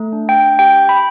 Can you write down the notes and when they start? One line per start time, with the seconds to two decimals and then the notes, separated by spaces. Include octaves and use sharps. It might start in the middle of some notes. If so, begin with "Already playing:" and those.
Already playing: A3
0.13 D4
0.29 G5
0.59 G4 G5
0.89 B5